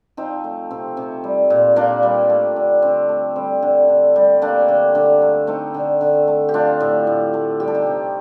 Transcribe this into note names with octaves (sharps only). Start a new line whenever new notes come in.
F3 C4 D#4
A3
C3 C4
C3
G3
A#2
A#2 A#3 D4
G3
A3
D3
D3 C4
A3
G3 C4
D3
D3
G3
A3 A#3 D4
D3
D3
A3
A3 C4 D#4
D3
D3
A3
G4
A3 D4 F4
A2
A2
A3
G3 G4
A4
D#4 G4
C3